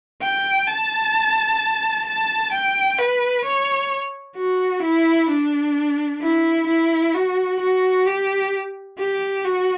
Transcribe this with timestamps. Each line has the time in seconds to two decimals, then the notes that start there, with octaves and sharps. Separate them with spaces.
0.22 G5
0.68 A5
2.06 A5
2.52 G5
2.99 B4
3.45 C#5
4.37 F#4
4.83 E4
5.30 D4
6.21 E4
6.67 E4
7.14 F#4
7.60 F#4
8.06 G4
8.98 G4
9.44 F#4